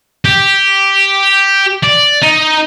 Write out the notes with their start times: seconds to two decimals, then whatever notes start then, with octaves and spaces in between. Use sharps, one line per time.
0.25 G4
1.83 D5
2.23 D#4